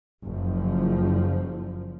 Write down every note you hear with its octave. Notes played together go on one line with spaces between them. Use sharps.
F#1 F3